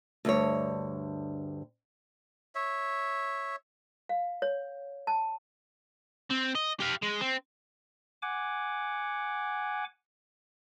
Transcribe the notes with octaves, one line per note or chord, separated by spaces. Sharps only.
D2 G2 C#5
C#5 E5
F5
C#5
A5
C4
D#5
G4 F5
G#3
C4
F#5 G#5 D6